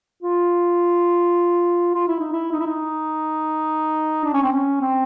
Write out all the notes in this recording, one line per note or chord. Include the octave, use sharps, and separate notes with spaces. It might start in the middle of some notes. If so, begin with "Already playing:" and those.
F4
F4
E4
D#4
E4
D#4
E4
D#4
D4
C#4
C4
C#4
C4